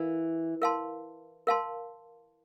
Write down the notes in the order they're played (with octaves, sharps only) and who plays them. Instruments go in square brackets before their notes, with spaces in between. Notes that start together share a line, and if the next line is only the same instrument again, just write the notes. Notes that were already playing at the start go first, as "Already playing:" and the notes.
Already playing: [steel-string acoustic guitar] E3 [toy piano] A#4 F5
[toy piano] A#4 F5 A5 C6
A#4 F5 A5 C6